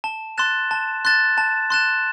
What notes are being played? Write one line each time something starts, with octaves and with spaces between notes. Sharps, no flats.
A5
C6 F#6 A6 E7
A5
C6 F#6 A6 E7
A5
C6 F#6 A6 E7